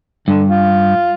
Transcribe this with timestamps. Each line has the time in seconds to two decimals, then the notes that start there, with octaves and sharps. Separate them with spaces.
0.28 G2 D3
0.48 F4